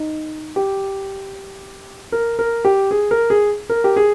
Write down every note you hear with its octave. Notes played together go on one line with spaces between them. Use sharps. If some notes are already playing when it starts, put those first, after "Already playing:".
Already playing: D#4
G4
A#4
A#4
G4
G#4
A#4
G#4
A#4
G4
G#4